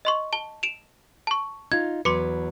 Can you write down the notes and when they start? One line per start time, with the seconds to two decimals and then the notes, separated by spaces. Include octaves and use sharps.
0.05 D#5 C6 C#6
0.33 A5 G7
0.63 D7 E7 F7
1.27 A5 C#6
1.72 D#4 F4 G#6
2.05 E2 F#3 B4 C6 D6 C#7